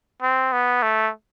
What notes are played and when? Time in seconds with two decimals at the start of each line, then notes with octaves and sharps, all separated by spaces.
0.22 C4
0.52 B3
0.83 A3